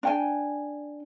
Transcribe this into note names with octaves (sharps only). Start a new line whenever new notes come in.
D4 G5 G#5